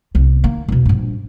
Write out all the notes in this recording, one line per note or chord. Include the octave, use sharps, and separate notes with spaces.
C2 B3
D#3 A#3
E2 B2
A#1 G2